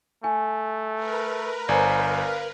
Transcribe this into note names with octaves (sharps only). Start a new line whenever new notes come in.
A3 G#5
A#4 B4
G1 C5 D5 F5 G#5 A#5